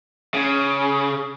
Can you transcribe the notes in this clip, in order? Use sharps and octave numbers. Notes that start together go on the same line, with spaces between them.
C#3